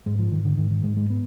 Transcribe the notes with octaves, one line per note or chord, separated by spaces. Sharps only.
G#2 G#3
F3
G#2 D#3
D3
G#2 D#3
D#3
G#2 G#3
G#3
B3